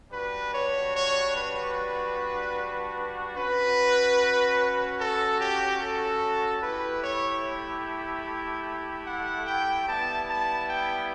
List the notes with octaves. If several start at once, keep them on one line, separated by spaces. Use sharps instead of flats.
G3 D4 F#4 B4
C#5
C#5
B4
C#4 F#4 B4
A4
G4
A4
A3 E4 G4 B4
C#5
F#5
G5
G3 B3 E4 A5
A5
G5